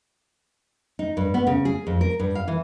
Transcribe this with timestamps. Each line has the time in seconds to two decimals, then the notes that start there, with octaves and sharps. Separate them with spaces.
0.99 D#4
1.17 G2
1.34 B3
1.47 C#3
1.65 G#4
1.87 F2
2.01 A#4
2.19 G2
2.35 F5
2.48 E3